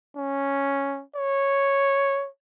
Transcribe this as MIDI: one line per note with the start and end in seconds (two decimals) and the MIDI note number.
0.17 1.03 61
1.16 2.28 73